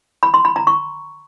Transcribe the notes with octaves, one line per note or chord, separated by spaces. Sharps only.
B5
C6
B5
A#5
C#6